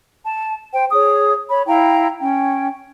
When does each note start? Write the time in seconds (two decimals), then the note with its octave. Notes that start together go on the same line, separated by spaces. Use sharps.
0.25 A5
0.73 C5 G5
0.92 G#4 C#5 D#6
1.50 C#5 B5
1.67 E4 F5 G5 A#5
2.20 C#4 G5